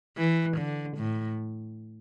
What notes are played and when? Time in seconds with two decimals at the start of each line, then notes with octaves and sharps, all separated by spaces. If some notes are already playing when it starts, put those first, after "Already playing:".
0.17 E3
0.57 D3
0.98 A2